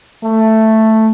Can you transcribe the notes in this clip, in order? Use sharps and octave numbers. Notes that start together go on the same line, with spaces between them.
A3